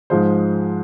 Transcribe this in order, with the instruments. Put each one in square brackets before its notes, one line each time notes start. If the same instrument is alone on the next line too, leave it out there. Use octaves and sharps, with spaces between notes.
[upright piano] G#2 F3 G#3 C5